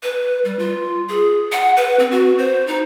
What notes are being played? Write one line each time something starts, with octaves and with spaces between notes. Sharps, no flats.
B4
G3
F4
G#4
F#5
B4
C4
F#4
C5
D#4